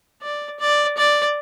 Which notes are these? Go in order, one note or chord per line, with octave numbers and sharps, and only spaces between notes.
D5
D5
D5